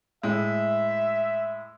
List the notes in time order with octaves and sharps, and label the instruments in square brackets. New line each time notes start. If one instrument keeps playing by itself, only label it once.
[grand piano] A2 G#3 [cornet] E5